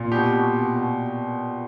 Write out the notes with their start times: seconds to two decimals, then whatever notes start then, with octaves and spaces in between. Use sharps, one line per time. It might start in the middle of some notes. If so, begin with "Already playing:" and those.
Already playing: A#2
0.12 B2 G4
0.33 B2
0.54 B2
0.75 B2